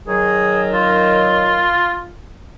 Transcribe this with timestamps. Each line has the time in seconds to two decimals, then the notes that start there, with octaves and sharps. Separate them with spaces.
0.08 D#3 F#3 G#4
0.74 F4